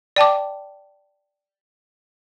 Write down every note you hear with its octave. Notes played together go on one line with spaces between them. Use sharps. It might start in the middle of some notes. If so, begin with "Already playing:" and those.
D5 G5 A5 D6